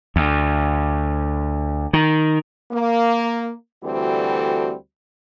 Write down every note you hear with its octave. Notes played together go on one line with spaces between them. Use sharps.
D2
D#3
A#3
D2 E3 G3 C4 F#4 A4